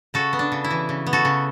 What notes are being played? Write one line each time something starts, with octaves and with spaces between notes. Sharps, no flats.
C#3 F#4 A4
B3
D4
C#3
E4
E3
C#3
B3
F#4 A4
C#3